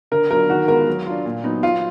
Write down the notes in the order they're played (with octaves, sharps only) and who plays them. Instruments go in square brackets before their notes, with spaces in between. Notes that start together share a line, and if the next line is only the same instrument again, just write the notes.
[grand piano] D3 [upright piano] A#4
[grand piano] F#3 B3 D4 F4 [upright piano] A#4
[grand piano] D#3 [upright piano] F#4
[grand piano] G#3 B3 F4 [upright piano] A#4
[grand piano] F#3
D4 F4
A#2
F#3 B3 D#4
[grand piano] F#3 [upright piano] F4